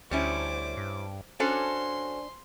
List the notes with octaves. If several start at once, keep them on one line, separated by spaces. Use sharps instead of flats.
D2 G3 C#4 E4 C5 D6
G2
C#4 D4 F#4 A4 C5 G#5 C6